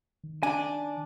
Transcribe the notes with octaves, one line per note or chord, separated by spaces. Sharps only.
D#3
D4 G#5